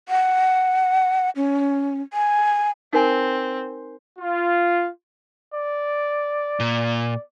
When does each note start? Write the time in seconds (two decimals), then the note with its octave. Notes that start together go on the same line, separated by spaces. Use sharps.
0.09 F#5
1.36 C#4
2.13 G#5
2.93 C4 D#4 A#4 G#5
4.19 F4
5.53 D5
6.60 A#2